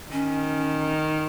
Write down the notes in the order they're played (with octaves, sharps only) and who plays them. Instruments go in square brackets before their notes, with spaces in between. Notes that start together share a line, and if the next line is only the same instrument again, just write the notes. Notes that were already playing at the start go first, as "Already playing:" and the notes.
[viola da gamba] D#3 [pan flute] C#4